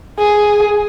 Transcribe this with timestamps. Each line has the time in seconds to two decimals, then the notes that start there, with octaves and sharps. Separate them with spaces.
0.19 G#4